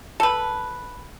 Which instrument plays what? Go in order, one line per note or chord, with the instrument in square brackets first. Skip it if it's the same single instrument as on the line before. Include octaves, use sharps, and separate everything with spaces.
[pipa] A4 B4